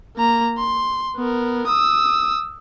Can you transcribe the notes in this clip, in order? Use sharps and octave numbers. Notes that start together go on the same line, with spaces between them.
A#3 A#5
C6
B3 A#4
D#6 E6